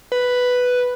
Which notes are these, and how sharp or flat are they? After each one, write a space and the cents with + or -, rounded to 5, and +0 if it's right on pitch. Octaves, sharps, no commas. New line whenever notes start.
B4 +0